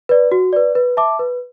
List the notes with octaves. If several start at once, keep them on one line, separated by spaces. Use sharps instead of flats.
B4 D5
F#4
B4 D5
B4
E5 A5 D6
B4